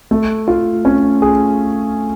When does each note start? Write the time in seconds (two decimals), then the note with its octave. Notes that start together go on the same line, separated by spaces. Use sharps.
0.11 A3
0.48 F4
0.85 C#4
1.22 G#4